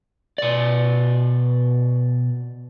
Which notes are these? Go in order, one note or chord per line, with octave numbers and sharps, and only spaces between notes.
B2 D5